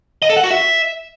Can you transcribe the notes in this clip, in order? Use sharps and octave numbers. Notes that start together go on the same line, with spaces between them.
D#5
A4
F#5
F#4
E5